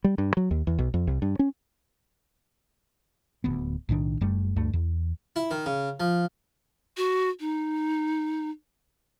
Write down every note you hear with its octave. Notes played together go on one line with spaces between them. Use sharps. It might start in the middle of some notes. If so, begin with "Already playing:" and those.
G3
G2
F#3
D#2
E2
B1
F2
C2
G2
C#4
D1 D2 B3
B1 A2 D#3 D4
F#1 F#2 G3 A3
D2 G2 A3
E2
E4
D#3
C#3
F3
F#4
D#4